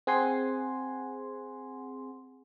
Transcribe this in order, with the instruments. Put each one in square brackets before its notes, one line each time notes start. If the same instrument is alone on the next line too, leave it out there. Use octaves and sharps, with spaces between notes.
[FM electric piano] C4 G#4 F#5 G#5 C6